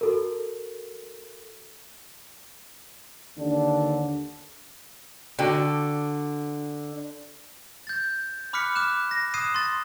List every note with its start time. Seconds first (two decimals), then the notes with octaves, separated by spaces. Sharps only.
0.01 F#4 A4 A#4
3.37 D#2 D3 D4
5.39 D3 D4 F#4 G5
7.87 G6 A6
8.53 B5 D6 F6 F#6 B6 C#7
8.75 D6 F6 F#6 E7
9.11 A#6
9.34 D#6 F#6 G#6 C7 D#7 E7
9.55 C6 A6